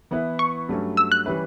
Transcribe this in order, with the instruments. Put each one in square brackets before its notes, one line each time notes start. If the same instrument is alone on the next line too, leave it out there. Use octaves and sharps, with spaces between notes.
[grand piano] E3 B3 E4 B4 E5
[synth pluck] C#6
[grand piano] G2 F#3 A3 C#4
[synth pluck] E6
F#6
[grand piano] E3 G3 C#4 E4 B4